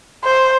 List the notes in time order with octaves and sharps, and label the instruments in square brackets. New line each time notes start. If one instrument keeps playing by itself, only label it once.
[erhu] C5